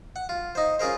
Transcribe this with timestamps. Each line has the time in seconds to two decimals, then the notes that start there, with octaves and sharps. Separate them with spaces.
0.16 F#5
0.29 F4
0.55 D#4 C5
0.79 C#4 F4 G#4 A#4 C5